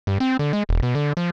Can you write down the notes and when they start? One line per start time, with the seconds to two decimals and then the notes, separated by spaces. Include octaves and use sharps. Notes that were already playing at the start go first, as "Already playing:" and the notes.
0.07 G2
0.20 C4
0.39 D3
0.53 G#3
0.69 E1
0.83 B2
0.95 D3
1.17 F3